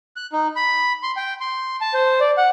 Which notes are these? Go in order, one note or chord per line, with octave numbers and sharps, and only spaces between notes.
F#6
D#4
B5
C6
G5
C6
A5
C5
D5
F#5